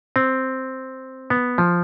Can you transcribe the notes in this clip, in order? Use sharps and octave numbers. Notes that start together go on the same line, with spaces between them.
C4
B3
F3